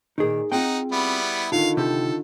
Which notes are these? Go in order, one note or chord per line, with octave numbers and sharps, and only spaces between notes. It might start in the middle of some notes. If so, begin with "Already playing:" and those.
A#2 D#3 D#4 G#4
C4 D#4 F4 G#4 F#5 G5
G3 B3 E4
D3 D#3 D#4 F4 F5
C3 G4 A4